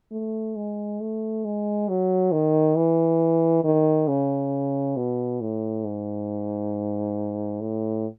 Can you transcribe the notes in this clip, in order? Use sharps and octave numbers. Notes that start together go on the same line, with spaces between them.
A3
G#3
A3
G#3
F#3
D#3
E3
D#3
C#3
B2
A2
G#2
A2